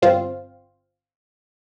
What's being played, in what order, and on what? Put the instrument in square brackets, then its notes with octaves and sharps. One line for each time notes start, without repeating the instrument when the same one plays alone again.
[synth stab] G1 C4 F4